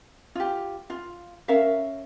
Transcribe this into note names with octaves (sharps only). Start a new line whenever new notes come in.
F4 G4
F4
C#4 A#4 E5 F5